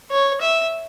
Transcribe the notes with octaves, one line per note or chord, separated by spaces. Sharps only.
C#5
E5